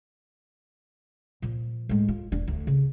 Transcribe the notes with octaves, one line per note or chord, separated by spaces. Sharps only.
A#2 F3
A2 G#3
F4
E1 D4
D2
C#3